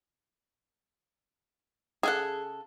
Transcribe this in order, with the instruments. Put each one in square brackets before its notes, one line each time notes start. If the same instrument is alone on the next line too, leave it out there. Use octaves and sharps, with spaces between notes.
[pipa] C#3 A4 F#5 [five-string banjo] G#4